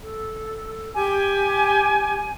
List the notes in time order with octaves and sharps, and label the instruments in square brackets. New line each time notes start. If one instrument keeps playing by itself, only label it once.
[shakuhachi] A4
[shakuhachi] G4 [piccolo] G#5